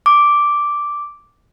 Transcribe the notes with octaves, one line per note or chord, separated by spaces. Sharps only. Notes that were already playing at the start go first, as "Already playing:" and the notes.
D6